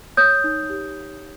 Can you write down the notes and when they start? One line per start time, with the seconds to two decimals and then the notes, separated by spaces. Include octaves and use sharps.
0.17 C#5 D#6 G6
0.44 D#4
0.69 G4